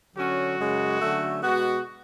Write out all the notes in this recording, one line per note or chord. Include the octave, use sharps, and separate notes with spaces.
D3 F#3 C#4 F#4
F#2 C#3 G#3 C#4
D3 F#3 A3 C#4
B2 G#3 B3 F#4